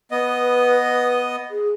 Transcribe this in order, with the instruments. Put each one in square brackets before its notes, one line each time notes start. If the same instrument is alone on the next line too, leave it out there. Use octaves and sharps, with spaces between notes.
[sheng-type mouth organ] B3 D#5 [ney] B4
[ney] G#4